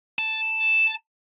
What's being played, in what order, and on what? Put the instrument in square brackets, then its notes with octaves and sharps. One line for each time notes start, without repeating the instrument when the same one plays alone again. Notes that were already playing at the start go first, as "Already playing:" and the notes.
[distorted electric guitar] A5